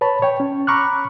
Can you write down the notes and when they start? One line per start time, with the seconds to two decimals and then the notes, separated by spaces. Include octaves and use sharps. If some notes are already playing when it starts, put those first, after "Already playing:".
0.01 B4 C#5 A5 B5
0.22 C#5 G5
0.40 C#4
0.67 A#5 B5 C#6 D6 F6 F#6